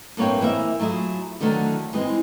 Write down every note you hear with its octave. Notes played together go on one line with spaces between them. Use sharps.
G2 A#3 C4 C#5 E5 G5
E3 A#3 C4 E5
F#3 A3 E4 F4 G#4
D3 D#3 F#3 A3
E3 G#3 C4